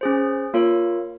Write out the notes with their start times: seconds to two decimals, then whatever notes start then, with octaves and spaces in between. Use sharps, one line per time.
0.01 C#4 G#4 C5
0.54 A#3 F4 A#4 C#5